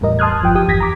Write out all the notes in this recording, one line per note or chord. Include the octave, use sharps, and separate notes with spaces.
E2 A2 G3 A#4 D#5
A5 C6 D#6 F6 F#6 G#6
G1 F3 G5
G4 D#6
G1 E2 G#6 A#6 B6
A#5 D6 B6